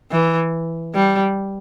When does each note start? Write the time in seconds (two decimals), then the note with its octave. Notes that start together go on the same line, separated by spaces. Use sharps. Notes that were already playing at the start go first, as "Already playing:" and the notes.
0.12 E3
0.94 G3